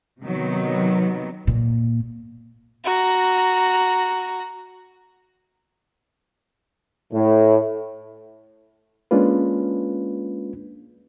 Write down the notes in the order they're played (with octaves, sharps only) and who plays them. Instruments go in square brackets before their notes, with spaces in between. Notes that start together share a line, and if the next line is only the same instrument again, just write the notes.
[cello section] C3 D#3 F#3 B3
[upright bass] A#2
[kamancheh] F#4 A#5
[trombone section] A2
[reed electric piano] G#3 A#3 C#4 D4 F4 B4